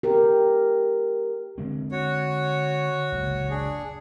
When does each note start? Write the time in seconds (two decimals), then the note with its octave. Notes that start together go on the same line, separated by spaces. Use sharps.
0.03 G4 A#4
1.58 D3 G#3 C4
1.92 F#4 C#5
3.12 F#1 C#2
3.50 D4 G#4